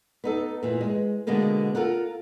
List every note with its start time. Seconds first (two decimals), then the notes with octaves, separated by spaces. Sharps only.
0.24 B3 D#4 A4
0.63 A#2 E3
0.81 G#3
1.27 B2 D3 G#3 A#3 B3
1.75 F4 A4 A#4 F#5